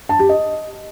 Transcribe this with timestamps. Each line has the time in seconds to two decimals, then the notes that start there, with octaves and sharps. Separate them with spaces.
0.09 A5
0.19 G4
0.29 D#5